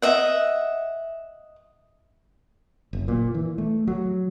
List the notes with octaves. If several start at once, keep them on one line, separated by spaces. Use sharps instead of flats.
D#5 E5 F#5
F#1
A#2
E3
A3
F#3